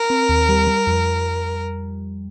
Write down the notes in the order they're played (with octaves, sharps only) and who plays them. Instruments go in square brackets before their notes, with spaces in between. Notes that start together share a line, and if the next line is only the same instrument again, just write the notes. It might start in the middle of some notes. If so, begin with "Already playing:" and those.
Already playing: [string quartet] A#4
[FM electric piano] C4
D#2
G3
G3
F2